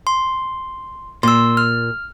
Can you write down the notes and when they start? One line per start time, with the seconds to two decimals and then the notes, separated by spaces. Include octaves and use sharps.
0.07 C6
1.23 A#2 C6 E6
1.57 F6